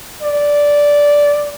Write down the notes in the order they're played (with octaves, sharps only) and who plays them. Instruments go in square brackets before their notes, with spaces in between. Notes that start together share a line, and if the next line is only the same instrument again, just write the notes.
[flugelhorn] D5